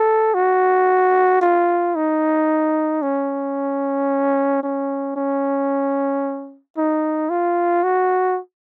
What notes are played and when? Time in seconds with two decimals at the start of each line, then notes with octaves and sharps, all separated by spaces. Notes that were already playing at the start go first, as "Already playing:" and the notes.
Already playing: A4
0.34 F#4
1.41 F4
1.96 D#4
3.02 C#4
4.63 C#4
5.16 C#4
6.77 D#4
7.30 F4
7.83 F#4